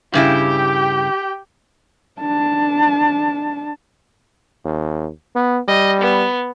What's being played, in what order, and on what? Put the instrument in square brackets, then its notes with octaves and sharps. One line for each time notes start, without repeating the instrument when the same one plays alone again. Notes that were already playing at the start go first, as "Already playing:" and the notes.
[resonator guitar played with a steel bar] G2 C#3 E4 [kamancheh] G4 G5
[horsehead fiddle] D4 A5
[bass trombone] D#2
B3
[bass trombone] G3 [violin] D#5
[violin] B3